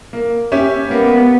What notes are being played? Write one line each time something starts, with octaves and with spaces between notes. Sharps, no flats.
A#3
C#4 G4 C#5 E5
A#3 B3